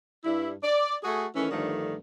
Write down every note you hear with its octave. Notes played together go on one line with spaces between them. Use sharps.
G2 E4
D5
A3 F#4 G#4
D#3 E3 A3 C#4
G2 D3 D#3 F3 A3